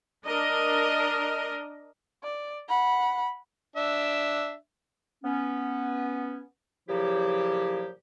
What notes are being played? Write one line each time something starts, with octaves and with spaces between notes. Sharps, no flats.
D4 A#4 D#5
D5
F#5 B5
D4 E5
B3 C#4
A#2 C#3 F3 F#3 E4 G4